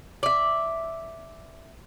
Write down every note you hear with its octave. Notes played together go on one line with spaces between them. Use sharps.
D5 E5